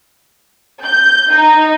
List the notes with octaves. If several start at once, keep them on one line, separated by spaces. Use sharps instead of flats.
G6
D#4